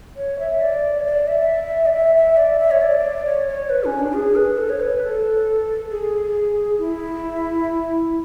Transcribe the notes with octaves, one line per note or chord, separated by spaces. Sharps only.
C#5
E5
D5
C#5
D5
E5
D5
E5
E5
D5
E5
C#5
D5
C#5
C#5
B4
C#4
D4
G#4
B4
A4
C#5
B4
A4
G#4
E4